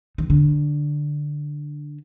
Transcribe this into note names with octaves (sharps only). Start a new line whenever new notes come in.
D#3
D3